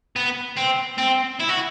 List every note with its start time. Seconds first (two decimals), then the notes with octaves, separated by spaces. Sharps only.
0.16 B3
0.57 C4
0.98 C4
1.40 E4
1.49 F#4